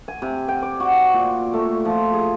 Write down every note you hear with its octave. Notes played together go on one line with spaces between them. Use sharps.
G#5
C3
G5
D5
F#4
A#2
A3
F3
G#4